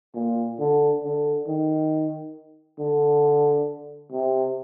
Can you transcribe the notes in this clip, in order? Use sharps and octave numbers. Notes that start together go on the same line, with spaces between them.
A#2
D3
D3
D#3
D3
C3